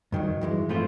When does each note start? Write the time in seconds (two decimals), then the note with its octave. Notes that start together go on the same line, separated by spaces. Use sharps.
0.12 G2 D#3 F#3
0.41 G2 E3 G#3
0.69 A2 F3 A3 C4 F4